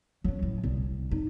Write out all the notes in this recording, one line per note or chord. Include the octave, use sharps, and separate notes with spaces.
F#3 C#4
A2
C2
D#4